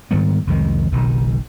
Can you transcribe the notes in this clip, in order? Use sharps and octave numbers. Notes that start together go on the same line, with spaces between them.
G#2 D#3 G3 B3
C2 F2 D#3 G#3
F#1 B1 B2 D#3